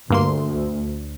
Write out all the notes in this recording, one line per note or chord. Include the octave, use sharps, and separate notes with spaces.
D2 G2 A#3 C6